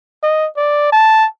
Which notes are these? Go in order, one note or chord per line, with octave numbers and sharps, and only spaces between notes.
D#5
D5
A5